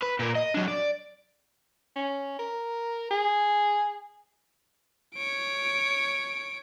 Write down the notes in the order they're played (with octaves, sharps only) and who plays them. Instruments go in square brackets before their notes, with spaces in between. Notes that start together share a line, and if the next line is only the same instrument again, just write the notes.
[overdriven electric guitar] B4
A#2 A#4
D#5
F#3 D4
D5
[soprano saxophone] C#4
A#4
G#4
[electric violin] C#5 D7